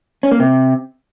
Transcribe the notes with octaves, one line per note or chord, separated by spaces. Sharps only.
C#4
A#3
C3